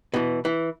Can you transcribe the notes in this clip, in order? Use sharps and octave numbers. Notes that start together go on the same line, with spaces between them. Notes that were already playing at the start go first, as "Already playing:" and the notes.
B2 E3
E3